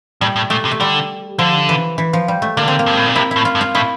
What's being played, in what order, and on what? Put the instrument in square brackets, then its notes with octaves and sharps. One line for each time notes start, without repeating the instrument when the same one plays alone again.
[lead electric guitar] A2 [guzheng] G3
[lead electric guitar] A2
[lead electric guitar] A#2 [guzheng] A3
[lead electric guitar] C3
[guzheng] A3
[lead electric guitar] D3 [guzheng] G3
[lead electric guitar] D3 [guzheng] F3
[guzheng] E3
E3
F3
G3
A3
[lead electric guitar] D3 [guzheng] A#3
[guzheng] C4
A#3
[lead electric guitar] G2
A2
A#2
[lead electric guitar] C3 [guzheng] E4
[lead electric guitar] A2 [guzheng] E4
[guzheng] F4
[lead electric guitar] G2
[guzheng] F4
[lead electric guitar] A2 [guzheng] E4